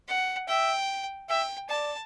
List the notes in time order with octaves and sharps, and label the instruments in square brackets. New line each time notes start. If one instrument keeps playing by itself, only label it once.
[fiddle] F#5
[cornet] E5 [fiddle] G5
[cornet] E5 [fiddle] G5
[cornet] D5 [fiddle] A5